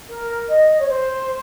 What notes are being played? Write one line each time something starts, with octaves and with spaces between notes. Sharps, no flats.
A#4
D#5
C#5
C5